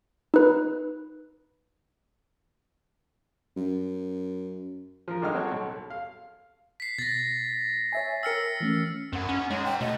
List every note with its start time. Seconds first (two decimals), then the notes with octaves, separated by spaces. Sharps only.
0.34 D#4 B4
3.56 F#2
5.08 F3 A#4
5.22 G2 D3 G#3 D#4 G5 F6
5.34 F#3 C4 F#4 A4 C#5
5.52 B1
5.67 A4
5.90 F5
6.80 B6 C7
6.98 B2 A6 A#6
7.92 C#5 E5 G#5
8.23 A#4 G5 E6 F6 C#7
8.60 E3 A3 C#4
9.13 F#2 C4 F#5
9.29 C#4
9.51 G#3 D#4 C#5 F#5
9.65 G5
9.81 B2 A3 D#5